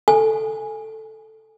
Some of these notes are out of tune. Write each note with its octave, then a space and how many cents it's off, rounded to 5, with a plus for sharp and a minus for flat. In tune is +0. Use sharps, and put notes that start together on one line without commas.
A4 +0 G#5 -10